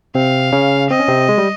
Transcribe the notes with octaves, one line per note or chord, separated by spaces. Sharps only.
C3 C4 F5
C#3 C#4
C4 D#5
C#4
C3 C4
G#3
G3